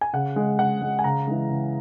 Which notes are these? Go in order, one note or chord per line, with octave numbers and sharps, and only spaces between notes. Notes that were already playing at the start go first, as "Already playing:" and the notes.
G#5
C#3 F#5
G#3
C#3 F#5
G#3
G#5
C#3 A#5
E3 G#3
C#3